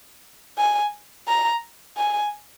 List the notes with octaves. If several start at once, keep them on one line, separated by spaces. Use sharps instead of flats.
G#5
A#5
G#5